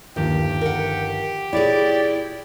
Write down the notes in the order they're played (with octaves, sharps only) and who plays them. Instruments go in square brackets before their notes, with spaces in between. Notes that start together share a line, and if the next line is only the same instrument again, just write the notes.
[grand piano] G1 D#3 F3 [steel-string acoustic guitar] D#2 [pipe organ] G4
[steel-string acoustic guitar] A#4 F#5
[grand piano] A#2 C#5 [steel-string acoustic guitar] E4 G#4 [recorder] D5